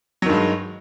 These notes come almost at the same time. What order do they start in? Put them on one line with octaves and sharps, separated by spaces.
F#3 D#3 G2 G#3